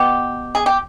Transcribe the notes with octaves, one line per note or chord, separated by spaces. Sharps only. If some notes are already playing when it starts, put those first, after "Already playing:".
Already playing: B2 B3 G4
G#4
G4